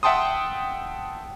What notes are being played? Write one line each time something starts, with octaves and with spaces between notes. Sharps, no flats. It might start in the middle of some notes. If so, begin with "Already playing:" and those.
E5 F#5 G5 A5 C6 D#6